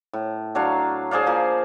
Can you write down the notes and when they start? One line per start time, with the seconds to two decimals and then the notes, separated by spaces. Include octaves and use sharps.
0.13 A2
0.55 F#3 D4 C#5 F5
1.11 G#4 C5 D5 F5
1.27 F3 A#3